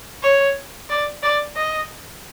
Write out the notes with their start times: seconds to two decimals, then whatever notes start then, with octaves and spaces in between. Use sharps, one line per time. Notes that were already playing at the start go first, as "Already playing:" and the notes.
0.23 C#5
0.89 D5
1.23 D5
1.56 D#5